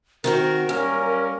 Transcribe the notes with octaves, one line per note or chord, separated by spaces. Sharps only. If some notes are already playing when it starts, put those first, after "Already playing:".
D#3 C4 F#4 A#4
F#2 G3 A#3 C#4